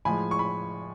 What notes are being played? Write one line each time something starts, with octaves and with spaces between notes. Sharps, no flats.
A2 F3 G#3 G#5 B5
C#6
B5